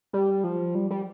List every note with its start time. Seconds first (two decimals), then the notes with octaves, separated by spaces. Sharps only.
0.13 G3
0.44 F3
0.75 G3
0.90 G3